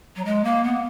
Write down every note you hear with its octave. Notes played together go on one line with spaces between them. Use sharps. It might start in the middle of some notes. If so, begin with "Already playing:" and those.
F#3
G#3
A#3
B3